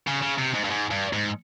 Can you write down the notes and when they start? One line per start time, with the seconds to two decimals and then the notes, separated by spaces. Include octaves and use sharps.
0.07 C#3
0.22 C#3
0.38 C3
0.54 G#2
0.64 G2
0.71 G#2
0.91 G2
1.13 G#2